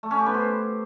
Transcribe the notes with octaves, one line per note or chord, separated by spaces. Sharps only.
A3
C#4
G4
B3
C5